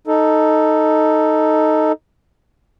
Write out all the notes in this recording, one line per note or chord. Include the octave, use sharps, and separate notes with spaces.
D#4 A4